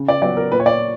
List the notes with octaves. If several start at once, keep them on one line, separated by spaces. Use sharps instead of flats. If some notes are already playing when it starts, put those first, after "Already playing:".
Already playing: C#3
D5
F#3 B3 D5
A#4
A#2 B4
C#5
D5